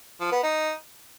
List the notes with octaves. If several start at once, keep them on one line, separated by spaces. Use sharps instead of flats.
F3
B3
D#4